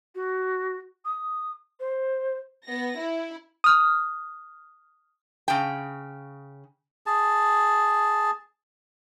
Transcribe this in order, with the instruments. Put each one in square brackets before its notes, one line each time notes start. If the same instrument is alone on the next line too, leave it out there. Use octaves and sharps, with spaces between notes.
[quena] F#4
D#6
C5
[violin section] B3 A#6
E4
[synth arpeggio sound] D#6 F6
[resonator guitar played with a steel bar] C#3 G5
[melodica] G#4 A5